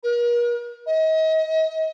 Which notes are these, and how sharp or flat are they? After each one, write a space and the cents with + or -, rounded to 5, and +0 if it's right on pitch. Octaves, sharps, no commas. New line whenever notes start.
A#4 +40
D#5 +35